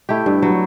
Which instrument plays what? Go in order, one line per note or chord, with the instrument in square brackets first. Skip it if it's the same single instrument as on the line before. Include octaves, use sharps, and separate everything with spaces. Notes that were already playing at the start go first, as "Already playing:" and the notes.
[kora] A3 E4 G4
G2
F#3 B3